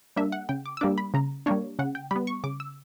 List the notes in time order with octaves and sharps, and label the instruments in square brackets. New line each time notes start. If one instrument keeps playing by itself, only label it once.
[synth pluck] G3 A#3 D4 E5
F#5
C#3 G5
D6
E6
G3 A#3 D4 D6
B5
C#3 A#5
G3 A#3 D4 C#5
C#3 F#5
G5
G3 B3 B5
C#6
C#3 D6
E6